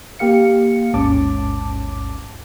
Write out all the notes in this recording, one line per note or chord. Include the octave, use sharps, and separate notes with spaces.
A#3 G4 F5 C#7
A1 D#2 G#2 C#4 A5 D6